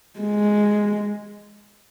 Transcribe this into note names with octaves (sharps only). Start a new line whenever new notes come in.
G#3